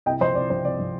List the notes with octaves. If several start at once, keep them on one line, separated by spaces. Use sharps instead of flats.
C2 D#5 G5
F3 C5 D#5
C2 D5
F3 C5
C2 D5
F3